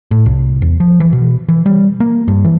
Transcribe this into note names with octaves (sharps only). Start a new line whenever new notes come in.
A2
C2
E2
F3
E3
B2
E3
G3
A#3
G2
E3